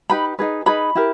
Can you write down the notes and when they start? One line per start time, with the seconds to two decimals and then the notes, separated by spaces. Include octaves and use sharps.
0.10 D#4 G4 B4 B5
0.39 D#4 G#4 B4
0.66 D#4 G#4 B4 B5
0.95 E4 G4 A#4